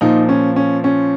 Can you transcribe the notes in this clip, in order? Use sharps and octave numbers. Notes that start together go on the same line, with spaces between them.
A#2 F3 D#4
C#4
C#4
C#4